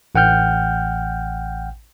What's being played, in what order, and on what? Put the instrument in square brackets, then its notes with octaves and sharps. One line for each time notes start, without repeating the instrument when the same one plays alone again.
[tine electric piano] A1 F#5 G5 F6 G6